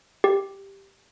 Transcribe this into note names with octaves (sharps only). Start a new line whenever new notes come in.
G4